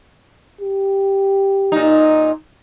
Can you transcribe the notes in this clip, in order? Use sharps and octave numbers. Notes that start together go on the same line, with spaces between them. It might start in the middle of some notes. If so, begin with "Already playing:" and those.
G4
A#2 D#4